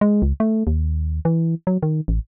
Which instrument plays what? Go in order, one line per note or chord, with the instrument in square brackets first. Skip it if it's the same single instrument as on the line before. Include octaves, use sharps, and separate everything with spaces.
[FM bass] G#3
C#2
A3
D#2
E3
F#3
D#3
A1